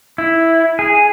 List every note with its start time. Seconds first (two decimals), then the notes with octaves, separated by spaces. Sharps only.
0.18 E4
0.79 G#4